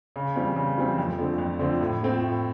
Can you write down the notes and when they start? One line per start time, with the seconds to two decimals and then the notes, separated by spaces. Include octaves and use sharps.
0.16 C#3
0.36 E3 G3 C4
0.56 C#3
0.78 E3 G3 C4
0.98 F2
1.19 D3 F3 A3 C4
1.38 F2
1.59 D3 F3 A3 C4
1.80 A2
2.01 F3 A3 C4
2.21 A2